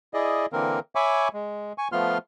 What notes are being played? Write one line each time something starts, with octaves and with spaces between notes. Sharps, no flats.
E4 G#4 D5 D#5
D3 E3 A#3 C4 A#4
C#5 E5 G#5 B5 C#6 D6
G#3
G#5 C#6
F3 A3 B3 F4 C6 F6